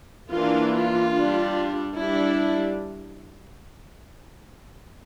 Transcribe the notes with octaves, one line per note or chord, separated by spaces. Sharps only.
E3 A#3 D4 F4
F4
G3 D4
G3 D4 E4